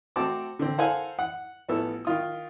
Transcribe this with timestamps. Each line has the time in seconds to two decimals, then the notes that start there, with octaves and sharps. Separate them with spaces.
0.16 A3 C4 F#4 A4 A5 D6
0.59 D3 C4
0.78 A4 A#4 C5 F5 F#5 G#5
1.19 F#5
1.68 A1 F3 B3 A4 E6
2.05 D#3 F4 D#6